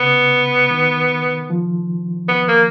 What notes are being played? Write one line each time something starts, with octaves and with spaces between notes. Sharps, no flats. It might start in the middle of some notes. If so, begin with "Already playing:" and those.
Already playing: C#3 B3
D#3
F3
B3
A#3